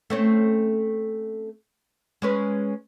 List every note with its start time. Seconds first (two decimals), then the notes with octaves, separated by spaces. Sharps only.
0.10 A3 C4 C#4
2.22 G#3 C#4 B4